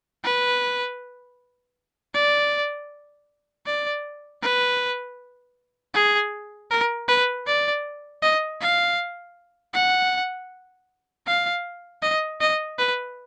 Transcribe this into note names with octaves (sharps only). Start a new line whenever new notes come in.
B4
D5
D5
B4
G#4
A#4
B4
D5
D#5
F5
F#5
F5
D#5
D#5
B4